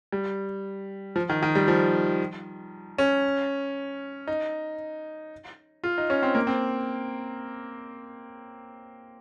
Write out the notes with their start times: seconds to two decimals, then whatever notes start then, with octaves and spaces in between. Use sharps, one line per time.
0.12 G3
1.16 F3
1.30 D#3
1.42 D#3
1.55 G3
1.68 F3
2.98 C#4
4.27 D#4
5.84 F4
5.98 D#4
6.10 C#4
6.23 C4
6.35 A#3
6.47 C4